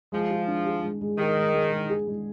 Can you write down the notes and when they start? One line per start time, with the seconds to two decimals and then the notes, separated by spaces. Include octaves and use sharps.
0.12 F3 G#3
0.31 G#4
0.47 D4
0.66 G#4
0.83 G#3
1.01 G#3
1.18 D#3 G#4
1.37 G#3
1.54 G#3
1.72 G#3
1.89 G#4
2.07 G#3